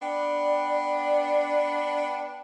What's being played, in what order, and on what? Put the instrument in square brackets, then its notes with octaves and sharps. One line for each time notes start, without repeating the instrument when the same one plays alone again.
[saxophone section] B3 D4 [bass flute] D5 [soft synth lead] G5